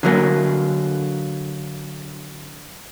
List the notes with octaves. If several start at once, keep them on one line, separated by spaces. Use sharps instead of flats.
D3 F#3 A#3